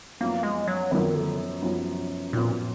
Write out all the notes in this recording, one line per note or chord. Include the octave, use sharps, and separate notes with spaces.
F#2 F3 A#3 B3
G#3
F#3
F#2 D#3 F3 B3
D3
F#2 F3 B3
F#2 A#2 F3 B3